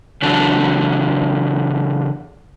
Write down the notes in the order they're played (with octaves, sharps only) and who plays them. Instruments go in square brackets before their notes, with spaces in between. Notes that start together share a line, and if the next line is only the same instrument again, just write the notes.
[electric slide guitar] C#3 E3 F#3 D4 A4 A5